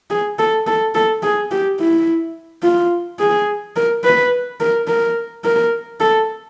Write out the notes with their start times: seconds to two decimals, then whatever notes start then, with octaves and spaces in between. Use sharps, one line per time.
0.10 G#4
0.39 A4
0.67 A4
0.95 A4
1.23 G#4
1.51 G4
1.80 E4
2.63 F4
3.19 G#4
3.76 A#4
4.04 B4
4.60 A#4
4.88 A#4
5.44 A#4
6.00 A4